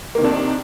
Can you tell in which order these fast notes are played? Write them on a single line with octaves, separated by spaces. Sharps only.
A#3 D#3 C3 D4